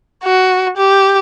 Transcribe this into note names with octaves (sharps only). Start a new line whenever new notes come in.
F#4
G4